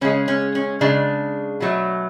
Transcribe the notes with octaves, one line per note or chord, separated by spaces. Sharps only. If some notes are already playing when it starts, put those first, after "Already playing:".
C#3 G#3 C#4
C#4
C#4
C#3 G#3 D4
B2 F#3 A3